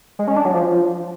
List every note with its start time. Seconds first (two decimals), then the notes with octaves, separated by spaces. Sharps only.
0.19 G#3
0.28 C#4
0.36 D4
0.45 F#3
0.54 F3